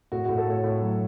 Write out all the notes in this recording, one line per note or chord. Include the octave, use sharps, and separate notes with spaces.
A2 F#4
A2 F#4
A4
A2 C#5
A2
F#3